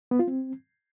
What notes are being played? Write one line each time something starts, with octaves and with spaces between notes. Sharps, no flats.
B3
F4
C4